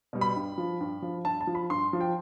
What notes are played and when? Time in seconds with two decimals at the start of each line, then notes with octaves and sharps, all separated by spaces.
0.13 B2 G3
0.21 B5
0.36 G2
0.58 F3
0.81 G2
1.02 F3
1.25 G2 A5
1.41 A5
1.47 F3
1.55 B5
1.70 G2 C6
1.93 F3
2.01 G5